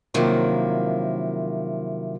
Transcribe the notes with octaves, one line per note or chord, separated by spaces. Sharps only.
C3 D#3 F3 F#3 A#3 E4